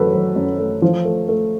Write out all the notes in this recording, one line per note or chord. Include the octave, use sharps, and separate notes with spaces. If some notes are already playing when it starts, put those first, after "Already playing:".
Already playing: F#2 F#3 A3 A4 B4
F#3
F#2
A3
F3
A3
A3